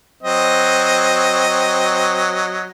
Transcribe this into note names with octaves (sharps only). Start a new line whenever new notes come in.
F#3 C4 D#5